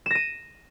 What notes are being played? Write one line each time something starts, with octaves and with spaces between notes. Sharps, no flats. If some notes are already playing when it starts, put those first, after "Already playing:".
A#6 D#7 E7